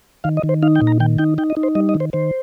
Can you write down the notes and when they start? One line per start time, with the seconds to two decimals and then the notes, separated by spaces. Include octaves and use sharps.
0.24 D#3 F5
0.37 D#5
0.43 D#3
0.49 C5
0.63 D#4 F5
0.76 G5
0.82 A#2
0.87 A#5
1.00 D#3 G5
1.18 D#4 G5
1.38 D#4 G5
1.50 D#5
1.57 D#4
1.63 C5
1.75 G3 D#5
1.89 D#5
1.95 D#3
2.00 C5
2.13 D#3 C5